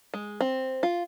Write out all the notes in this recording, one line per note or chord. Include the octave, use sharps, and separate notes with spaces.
G#3
C4
F4